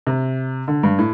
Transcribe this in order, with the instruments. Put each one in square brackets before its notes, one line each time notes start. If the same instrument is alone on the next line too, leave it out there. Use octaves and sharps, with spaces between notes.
[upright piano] C3
D3
G2
A2